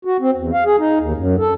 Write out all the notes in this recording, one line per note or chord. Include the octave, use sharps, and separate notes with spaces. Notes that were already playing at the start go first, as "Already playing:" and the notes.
F#4
C4
E2
F5
G#4
D#4
D#2
F#2
A4